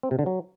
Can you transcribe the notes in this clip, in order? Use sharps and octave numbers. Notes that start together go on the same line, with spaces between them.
C4
C3
D3
F#3